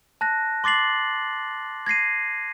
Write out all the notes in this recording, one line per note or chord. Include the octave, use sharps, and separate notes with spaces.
A5 F#6 A#6
C6 D6 A6 C7 F#7
G#6 A#6 C7 D#7